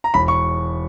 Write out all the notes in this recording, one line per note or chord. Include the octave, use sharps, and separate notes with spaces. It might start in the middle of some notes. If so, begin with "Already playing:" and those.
A#5
E1 B5
C#6